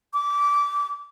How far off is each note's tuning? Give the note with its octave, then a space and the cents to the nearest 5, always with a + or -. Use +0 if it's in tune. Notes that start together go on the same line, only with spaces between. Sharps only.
D6 -20